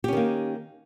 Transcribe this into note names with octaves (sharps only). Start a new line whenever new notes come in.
D#3 A#3 C#4 G4